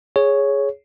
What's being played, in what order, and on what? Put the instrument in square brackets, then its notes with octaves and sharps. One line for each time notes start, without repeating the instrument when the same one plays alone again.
[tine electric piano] G#4 C#5